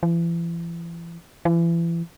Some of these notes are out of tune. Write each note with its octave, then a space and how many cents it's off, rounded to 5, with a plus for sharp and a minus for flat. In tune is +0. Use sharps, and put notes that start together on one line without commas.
E3 +40
E3 +35